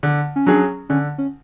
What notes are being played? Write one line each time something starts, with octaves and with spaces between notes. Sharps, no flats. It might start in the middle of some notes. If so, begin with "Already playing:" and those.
D3
C#4
F#3 C#4 D4 G#4
D3 C#4
C#4